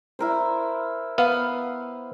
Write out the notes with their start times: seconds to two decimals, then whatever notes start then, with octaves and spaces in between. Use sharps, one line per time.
0.19 E4 A#4 C5
1.18 B3 F5